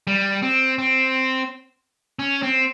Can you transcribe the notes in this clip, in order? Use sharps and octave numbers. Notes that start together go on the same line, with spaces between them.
G3
C4
C4
C#4
C4